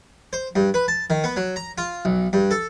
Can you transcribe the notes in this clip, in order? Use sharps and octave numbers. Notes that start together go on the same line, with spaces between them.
C5
G2
B4
A5
D#3
B3
F#3
A#5
F4
B1
G2
A4